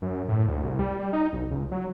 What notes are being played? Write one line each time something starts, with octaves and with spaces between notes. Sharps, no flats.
F#2
A2
D2
C2
G3
G3
D#4
B1
C#2
F#3